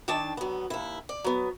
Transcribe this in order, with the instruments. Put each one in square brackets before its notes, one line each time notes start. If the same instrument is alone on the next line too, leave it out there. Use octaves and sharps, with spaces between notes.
[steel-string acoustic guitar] D#3 D4 A5
F#3 B3
D#2 E4
D5
F#3 B3